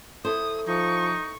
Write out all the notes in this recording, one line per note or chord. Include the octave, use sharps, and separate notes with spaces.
E4 A4 C5 D#6
F3 D#4 C#6